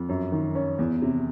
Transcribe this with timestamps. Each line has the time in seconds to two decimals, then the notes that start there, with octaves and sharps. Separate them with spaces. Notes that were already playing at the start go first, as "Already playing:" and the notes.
Already playing: F2
0.09 F#2
0.32 D#3
0.55 C#4
0.79 E2
1.02 C3